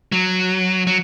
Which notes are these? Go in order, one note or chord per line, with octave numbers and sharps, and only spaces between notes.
F#3
F#3